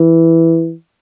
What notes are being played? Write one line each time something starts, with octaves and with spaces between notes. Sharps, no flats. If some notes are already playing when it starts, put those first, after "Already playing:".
Already playing: E3